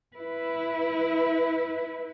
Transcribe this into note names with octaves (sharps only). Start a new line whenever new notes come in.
E4 B4